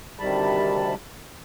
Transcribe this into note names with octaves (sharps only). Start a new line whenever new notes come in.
D2 C3 D#3 G3 A5 B5